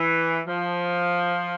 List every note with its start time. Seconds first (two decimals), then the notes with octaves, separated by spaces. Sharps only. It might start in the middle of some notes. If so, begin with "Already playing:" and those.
Already playing: E3
0.47 F3